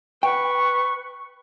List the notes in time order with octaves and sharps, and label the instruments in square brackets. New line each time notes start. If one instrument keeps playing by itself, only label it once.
[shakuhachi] B4 [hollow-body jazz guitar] G5 [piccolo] C#6